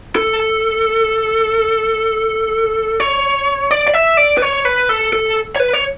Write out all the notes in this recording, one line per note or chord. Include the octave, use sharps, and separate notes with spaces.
A4
C#5
D5
D5
E5
D5
B4
C#5
B4
A4
A4
C#5
B4
C#5